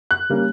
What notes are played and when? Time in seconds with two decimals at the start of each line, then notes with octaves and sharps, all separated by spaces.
0.11 F#6
0.30 G3 A#3 C#4